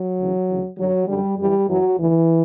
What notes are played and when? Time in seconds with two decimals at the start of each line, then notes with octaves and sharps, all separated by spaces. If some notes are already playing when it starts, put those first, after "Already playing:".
Already playing: F#3
0.18 D2 C#3 E3
0.48 D2 C#3 E3
0.77 F#2 D3 F#3
1.07 F#2 D3 G3
1.38 F#2 E3 G3
1.68 F#2 E3 F#3
1.97 D2 D3 E3